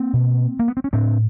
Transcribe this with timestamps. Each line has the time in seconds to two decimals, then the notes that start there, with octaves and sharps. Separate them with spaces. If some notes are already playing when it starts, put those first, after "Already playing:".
Already playing: A#3 C4
0.13 B2
0.59 A#3
0.68 B3
0.77 C4
0.84 C#4
0.93 A2 C4 D4